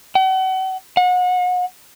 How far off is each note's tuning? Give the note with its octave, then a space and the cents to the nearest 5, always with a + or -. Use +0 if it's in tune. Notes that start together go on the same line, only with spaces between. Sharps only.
F#5 +40
F#5 -35